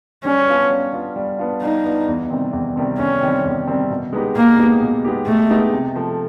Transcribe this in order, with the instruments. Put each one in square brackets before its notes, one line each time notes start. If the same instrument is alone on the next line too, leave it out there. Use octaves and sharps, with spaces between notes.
[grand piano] G3 [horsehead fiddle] C#4
[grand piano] B3 D4 F4
G3
B3 D4 F4
G3
B3 D4 F4
[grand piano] G3 [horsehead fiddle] D#4
[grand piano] B3 D4 F4
E2
C3 D#3 G3 C4
E2
C3 D#3 G3 C4
[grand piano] E2 [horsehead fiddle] C#4
[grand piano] C3 D#3 G3 C4
E2
C3 D#3 G3 C4
B2
G#3 B3 D#4 G4
[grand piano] B2 [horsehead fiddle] A#3
[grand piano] G#3 B3 D#4 G4
B2
G#3 B3 D#4 G4
[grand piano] B2 [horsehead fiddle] A3
[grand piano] G#3 B3 D#4 G4
C3
F3 A3